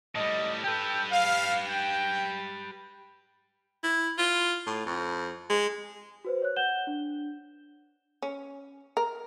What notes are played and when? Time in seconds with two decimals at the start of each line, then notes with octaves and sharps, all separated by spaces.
0.15 A2 G3 D#5
0.64 G4 A4 B4 G5
1.11 F5
1.68 G5
3.84 E4
4.18 F4
4.67 A2
4.85 F2
5.50 G#3
6.25 F#4 B4 C5
6.42 C#5 F#6
6.56 F#5 G6 E7 G7
6.87 D4
8.22 C#4
8.97 A#4